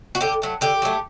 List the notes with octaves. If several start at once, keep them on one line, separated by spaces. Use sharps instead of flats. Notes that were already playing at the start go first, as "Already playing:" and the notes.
F#4
D3 G4
F#3 A3
D3 G4
F#3 A3